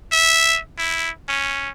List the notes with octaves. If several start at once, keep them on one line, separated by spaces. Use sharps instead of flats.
E5
E4
C#4